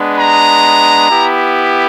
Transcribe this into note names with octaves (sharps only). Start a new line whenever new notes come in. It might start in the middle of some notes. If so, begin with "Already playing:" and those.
Already playing: G#3 B3 D4
A#5
B3 E4 G4